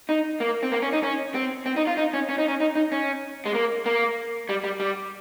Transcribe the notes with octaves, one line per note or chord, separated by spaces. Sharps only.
D#4
A#3
C4
A#3
C#4
D#4
C#4
C4
C4
D#4
F4
D#4
C#4
C#4
D#4
C#4
D#4
D#4
C#4
G#3
A#3
A#3
G3
G3
G3